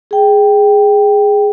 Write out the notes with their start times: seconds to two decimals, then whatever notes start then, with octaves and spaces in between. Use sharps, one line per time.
0.11 G#4 G5